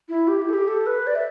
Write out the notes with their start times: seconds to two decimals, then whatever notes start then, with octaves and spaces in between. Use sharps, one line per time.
0.09 E4
0.28 G4
0.42 E4
0.49 A4
0.54 G4
0.68 A4
0.87 B4
1.07 D5
1.15 E5